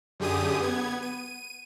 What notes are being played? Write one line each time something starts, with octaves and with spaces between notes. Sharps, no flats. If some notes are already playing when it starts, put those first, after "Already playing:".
F#2 D3 G4 G#4 D#6 D#7
B3 G#6
D#7